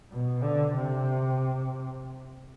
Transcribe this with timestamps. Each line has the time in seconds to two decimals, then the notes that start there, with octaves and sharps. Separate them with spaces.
0.12 B2
0.43 D3
0.75 C3